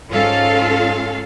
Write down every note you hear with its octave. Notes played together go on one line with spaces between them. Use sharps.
G#2 C#4 F4 A4 F5